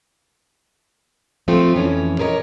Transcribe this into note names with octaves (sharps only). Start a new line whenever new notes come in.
F3 A3 C4 F4
F2 E3 C#4
G4 G#4 A#4 B4 C#5 D#5